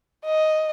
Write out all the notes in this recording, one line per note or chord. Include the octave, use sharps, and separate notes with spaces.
D#5